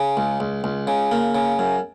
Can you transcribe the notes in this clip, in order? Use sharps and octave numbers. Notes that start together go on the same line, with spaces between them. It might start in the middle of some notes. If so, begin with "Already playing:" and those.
Already playing: C#3
C#2
C#2
C#2
C#3
A#3
C#3
F#2